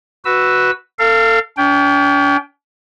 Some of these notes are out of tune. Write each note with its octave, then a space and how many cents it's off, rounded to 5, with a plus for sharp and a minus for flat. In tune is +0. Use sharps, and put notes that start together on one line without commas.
F#4 +0 B4 +0 E6 +0
A4 +35 F5 -15
C#4 +45 G5 +0